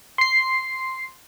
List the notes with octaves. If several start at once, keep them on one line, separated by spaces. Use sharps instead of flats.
C6 C7